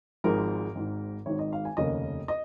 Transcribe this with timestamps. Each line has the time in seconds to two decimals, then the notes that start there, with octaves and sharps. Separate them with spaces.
0.24 G#1 G#2 F3 G#3 A#4
0.75 G#1 G#2 D#3
1.26 G#1 G#2 D#3 C#5
1.39 D#5
1.53 F5
1.65 G#5
1.77 F1 D#2 C#3 A#3 C#4 D#5
2.28 D#5